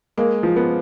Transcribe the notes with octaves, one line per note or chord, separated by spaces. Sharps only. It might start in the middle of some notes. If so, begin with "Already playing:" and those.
G#3 A#3
F3
B3